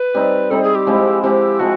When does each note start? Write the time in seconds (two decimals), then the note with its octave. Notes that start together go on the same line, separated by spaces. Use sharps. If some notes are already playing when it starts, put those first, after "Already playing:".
Already playing: B4
0.14 G3 C4 D#4
0.51 G3 C4 D#4 A4
0.63 G#4
0.75 G4
0.87 F3 G#3 C4 E4
1.23 F3 G#3 C4 E4 G4
1.59 F3 G#3 C4 F#4